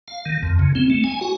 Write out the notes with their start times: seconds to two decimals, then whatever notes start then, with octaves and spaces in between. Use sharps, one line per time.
0.08 F5
0.26 D#3
0.43 F2
0.59 C#3
0.75 C4
0.90 A3
1.04 G#5
1.21 F#4